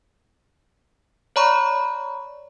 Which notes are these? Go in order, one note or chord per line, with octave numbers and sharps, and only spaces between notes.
C#5 D5 A#5 B5 C#6